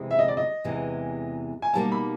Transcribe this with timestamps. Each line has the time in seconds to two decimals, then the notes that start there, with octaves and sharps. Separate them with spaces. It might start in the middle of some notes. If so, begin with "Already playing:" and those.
Already playing: F2 C3 E3 G#3
0.11 E5
0.19 D#5
0.28 D5
0.37 D#5
0.64 E2 C3 E3 G#3
1.62 G#5
1.73 B2 G3 A#3 D#4 A5
1.92 B5